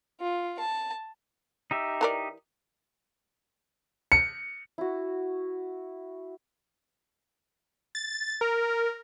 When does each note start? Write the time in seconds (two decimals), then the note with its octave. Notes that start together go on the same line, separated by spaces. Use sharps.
0.21 F4
0.59 A5
1.71 D#4 G4 E5
2.01 E3 A#4 D5
4.12 C#7
4.78 E4 F#4
7.95 A6
8.41 A#4